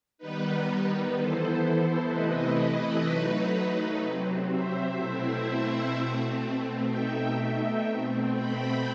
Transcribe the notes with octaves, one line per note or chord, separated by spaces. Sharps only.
D#3 G3 B3 D#4 B4
E3 B3 E4 A4 C5
C3 E3 A3 E4 B4 D#5
F#3 A3 D#4 B4
C3 F#3 C4
C5 E5
B2 A3 C4 E4
B2 A3 C4
B2 A3 D#4 E5 G5
B2 A3 C4
G5 B5